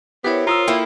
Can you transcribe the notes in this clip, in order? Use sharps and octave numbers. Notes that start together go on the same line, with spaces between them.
B3 E4 G4 A#4 C5 C#5
F4 A#5 D#6 E6
A#3 E4 A4 G5